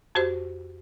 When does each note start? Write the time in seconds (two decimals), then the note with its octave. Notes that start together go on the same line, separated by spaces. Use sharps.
0.15 F2 F#4 G4 C5